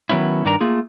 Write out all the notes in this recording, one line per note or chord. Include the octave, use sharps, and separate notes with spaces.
D#3 F#3 B3 C#4 E4
G2 D#3 D4 A#4 A#5
A3 A#3 F4 G#4